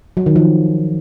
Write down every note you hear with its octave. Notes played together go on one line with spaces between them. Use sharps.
F#3
D#3
F3